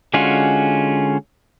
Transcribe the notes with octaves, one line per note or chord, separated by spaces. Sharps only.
D3 G#3 C#4 F4 F#4